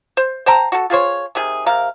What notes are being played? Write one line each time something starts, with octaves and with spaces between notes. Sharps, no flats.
C5
C5 G5 A5 A#5
F#4 A4
F4 G#4 C5 C#5
C3 D#3 G#4
C3 A#4 F5